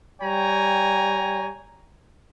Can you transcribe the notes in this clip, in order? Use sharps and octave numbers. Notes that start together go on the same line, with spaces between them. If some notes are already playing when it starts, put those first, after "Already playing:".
G3 C#5 G5 G#5 A#5